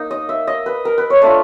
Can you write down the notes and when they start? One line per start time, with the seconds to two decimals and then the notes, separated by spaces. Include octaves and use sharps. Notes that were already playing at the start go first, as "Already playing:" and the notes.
Already playing: A#3 D#4
0.11 D#5
0.29 E5
0.47 D#5
0.66 B4
0.85 A#4
0.98 B4
1.10 C#5
1.21 A3 D4 F4 D5